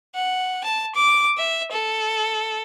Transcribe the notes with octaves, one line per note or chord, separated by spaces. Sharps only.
F#5
A5
D6
E5
A4